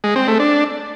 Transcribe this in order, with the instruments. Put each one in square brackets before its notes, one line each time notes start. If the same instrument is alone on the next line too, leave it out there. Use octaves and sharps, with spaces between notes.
[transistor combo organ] G#3
C4
A3
D4